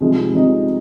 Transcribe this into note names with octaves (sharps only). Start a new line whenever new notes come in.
C2 C3 F3 G#3 D#4
C2 C3 F3 G#3 D#4